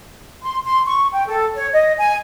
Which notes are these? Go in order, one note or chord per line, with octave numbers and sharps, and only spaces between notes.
C6
C6
C#6
G5
A4
C#5
D#5
G#5